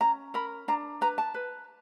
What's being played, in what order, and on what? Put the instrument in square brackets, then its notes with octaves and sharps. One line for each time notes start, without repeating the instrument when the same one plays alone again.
[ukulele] C#4 A#5
A#4 B5
D4 A#5
B4 A#5
A5
B4